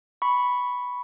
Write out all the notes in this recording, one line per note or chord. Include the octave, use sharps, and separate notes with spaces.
B5 C#6